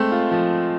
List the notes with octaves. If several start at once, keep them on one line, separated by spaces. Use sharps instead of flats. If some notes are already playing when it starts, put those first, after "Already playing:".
Already playing: G#3 A3 C4
F4
F3